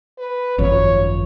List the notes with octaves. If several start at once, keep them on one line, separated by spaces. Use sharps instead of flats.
B4
G#1 F#2 F3 C#5